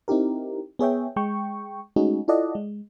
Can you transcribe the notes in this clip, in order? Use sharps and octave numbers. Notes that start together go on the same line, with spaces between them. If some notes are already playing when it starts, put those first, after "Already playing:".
C4 D#4 E4 G4 A#4
B3 G#4 C#5 E5 G5
G#3 G5 C#6
G#3 A3 C#4 D#4 F#4 G#4
E4 F4 A4 D5 D#5 F#5
G#3